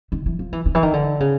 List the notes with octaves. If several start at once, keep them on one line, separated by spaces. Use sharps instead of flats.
D#3
E3
F3
E3
D#3
E3
D#3
D3
C#3